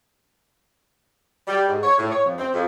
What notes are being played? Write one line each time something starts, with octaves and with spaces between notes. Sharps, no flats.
G3
G#2
C#5
A2
C#5
F2
C4
F2